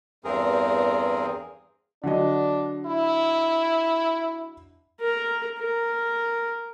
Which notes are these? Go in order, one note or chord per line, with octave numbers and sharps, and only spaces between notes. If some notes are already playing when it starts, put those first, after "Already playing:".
E2 G2 C4 G#4 A#4
D3 F#3 D4 D#5
E4
A#4
A#4